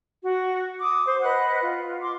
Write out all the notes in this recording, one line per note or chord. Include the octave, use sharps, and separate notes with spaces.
F#4
D6 D#6
C5 C6
B4 D#5 F#5 F#6
F4
C6 D6